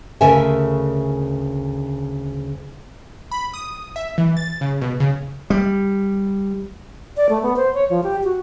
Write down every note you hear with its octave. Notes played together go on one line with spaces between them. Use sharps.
D2 C#3 A4 A#4 E5 G#5
B5
D#6
E5
E3
A6
C#3
B2
C#3
G3
D5
A3
B3
C5
C#5
F3
G4
F#4